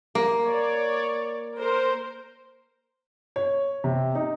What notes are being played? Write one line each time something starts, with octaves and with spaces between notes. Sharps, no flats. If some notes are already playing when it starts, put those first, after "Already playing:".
A#3
C#5 D5
A#4 C5
C#5
C3
D#4